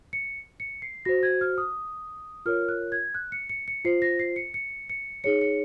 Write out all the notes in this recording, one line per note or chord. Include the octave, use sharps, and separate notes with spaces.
C#7
C#7
C7
F#4 C5 A#6
G#6
F6
D#6
F4 A#4 C#5 F6
F#6
G#6
F#6
C#7
C#7
C#7
F4 C5 C7
A#6
C7
C#7
C#7
C#7
D#4 G#4 C#5 C#7
C#7